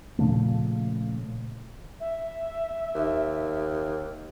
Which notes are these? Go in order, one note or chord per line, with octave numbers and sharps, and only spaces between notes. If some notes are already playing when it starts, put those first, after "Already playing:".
A#2 C#3 F3 A3
E5
D#2